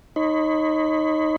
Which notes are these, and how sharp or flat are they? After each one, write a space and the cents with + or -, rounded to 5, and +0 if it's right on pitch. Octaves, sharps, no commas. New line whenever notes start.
D#4 +0 C#5 -25 B5 +30